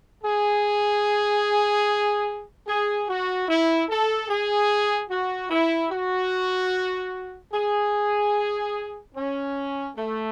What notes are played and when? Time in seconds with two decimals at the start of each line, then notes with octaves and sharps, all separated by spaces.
0.24 G#4
2.67 G#4
3.08 F#4
3.48 E4
3.89 A4
4.29 G#4
5.10 F#4
5.50 E4
5.90 F#4
7.53 G#4
9.15 C#4
9.96 A3